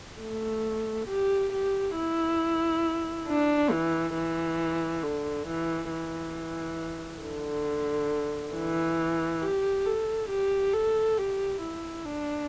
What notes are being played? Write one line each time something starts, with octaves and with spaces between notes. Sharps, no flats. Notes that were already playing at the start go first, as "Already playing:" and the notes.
A3
G4
G4
E4
D4
E3
E3
D3
E3
E3
D3
E3
G4
A4
G4
A4
G4
E4
D4